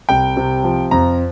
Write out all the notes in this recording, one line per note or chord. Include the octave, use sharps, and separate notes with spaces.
C2 G5
C3
F3
F2 A#5